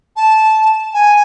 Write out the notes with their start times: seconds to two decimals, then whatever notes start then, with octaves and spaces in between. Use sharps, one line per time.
0.16 A5
0.94 G#5